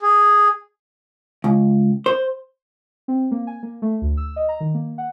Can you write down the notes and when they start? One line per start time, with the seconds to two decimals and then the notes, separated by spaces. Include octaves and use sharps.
0.02 G#4
1.44 C#2
2.06 C5
3.08 C4
3.31 A#3
3.47 G#5
3.63 A#3
3.82 A3
4.02 D2
4.17 E6
4.36 D#5
4.49 A#5
4.60 D#3
4.74 A#3
4.98 F#5